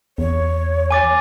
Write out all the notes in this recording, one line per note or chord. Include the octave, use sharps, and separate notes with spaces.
E2 C#5
G#5 D6 A6